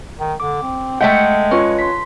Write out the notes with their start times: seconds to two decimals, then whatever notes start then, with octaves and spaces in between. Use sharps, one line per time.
0.20 D#3
0.40 D3 D6
0.62 C4
1.01 G#3 A3 E5 F#5 G5 G6
1.51 C#4 F4 B4 C#5
1.79 C6 B6